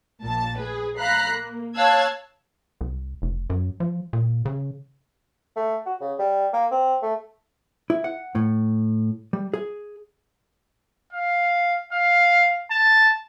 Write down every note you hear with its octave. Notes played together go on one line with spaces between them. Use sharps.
A#1 A#2 A5
G#4 B4
F5 A#5 B5 F#6 C7
A#3
C#5 F5 A5 E6 F#6 G#6
C2
F1
F#2
F3
A#2
C#3
A3
F#4
C#3
G3
A#3
C4
A3
E4
F#5
A2
G3
G#4
F5
F5
A5